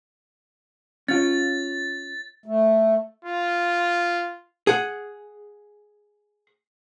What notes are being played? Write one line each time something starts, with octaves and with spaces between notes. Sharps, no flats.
C#4 F4 A6
A3
F4
G#4 F#5